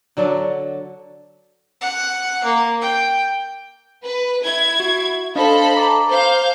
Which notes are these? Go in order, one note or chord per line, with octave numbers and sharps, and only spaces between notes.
D3 F#3 D4 A4
F#5
A#3
G5
B4
E4 G#6
F#4
D4 A4 C5 D#5 F5 B5
A5 A#5 D6
C5 F5 G6